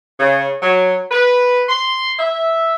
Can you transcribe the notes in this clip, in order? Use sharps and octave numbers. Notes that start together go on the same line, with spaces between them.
C#3
F#3
B4
C6
E5